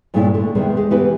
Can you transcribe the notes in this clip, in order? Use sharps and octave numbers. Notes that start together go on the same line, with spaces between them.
G2 A#2 G#3 A3 C#4 E4
D3 A3
E2 C3 D#3 G#3 B3
G#3
E3 B3 G4 B4